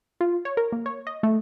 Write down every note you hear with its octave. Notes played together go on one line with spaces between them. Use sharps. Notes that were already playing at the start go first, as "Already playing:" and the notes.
F4
C#5
A#4
A#3
C#5
D#5
A3